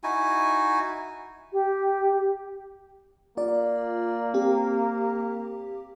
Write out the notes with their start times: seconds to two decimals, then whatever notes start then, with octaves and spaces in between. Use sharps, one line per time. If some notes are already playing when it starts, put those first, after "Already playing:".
0.04 D#4 E4 F#4 G#5
1.53 G4
3.37 A#3 F4 D5
4.34 C4 G4